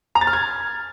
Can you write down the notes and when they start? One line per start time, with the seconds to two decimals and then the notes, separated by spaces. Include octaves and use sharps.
0.15 A#5
0.21 A6
0.27 F6
0.33 G#6